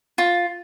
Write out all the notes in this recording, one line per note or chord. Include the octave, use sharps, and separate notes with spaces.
F4